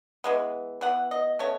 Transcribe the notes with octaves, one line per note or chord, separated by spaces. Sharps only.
E3 G#3 B3
E3 B3 F#5
D#5
B2 A3 C#4 C#5